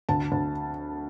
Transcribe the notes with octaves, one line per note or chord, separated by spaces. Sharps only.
D2 A5
D2